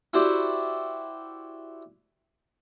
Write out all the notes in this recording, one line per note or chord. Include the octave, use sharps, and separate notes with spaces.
E4 F#4 G4 C5 D5